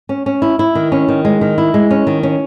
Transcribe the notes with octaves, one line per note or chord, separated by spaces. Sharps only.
C#4
C#4
E4
E4
D#3
C#4
D#3
G#3
D#3
E4
G#3
C#4
D#3
C#4